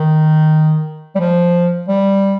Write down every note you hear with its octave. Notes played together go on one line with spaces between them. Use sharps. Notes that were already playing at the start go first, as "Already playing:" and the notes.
Already playing: D#3
G3
F3
G3